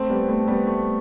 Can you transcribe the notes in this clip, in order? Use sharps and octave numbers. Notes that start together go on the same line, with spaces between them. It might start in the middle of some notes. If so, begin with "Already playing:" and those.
Already playing: A3 C4
G3 B3
A3 C4
G3 B3
A3